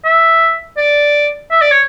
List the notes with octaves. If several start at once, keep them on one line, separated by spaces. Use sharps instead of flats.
E5
D5
E5
D5
C#5